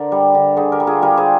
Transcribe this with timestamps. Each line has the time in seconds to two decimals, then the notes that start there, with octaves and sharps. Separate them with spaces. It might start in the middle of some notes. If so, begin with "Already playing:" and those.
Already playing: D3 A#4 C5 D5
0.12 G3
0.34 D3
0.57 D3 G#4 C5
0.72 G4 A#4
0.80 G3
0.87 F4 G#4
1.02 G3 G4 A#4
1.17 G#4 C5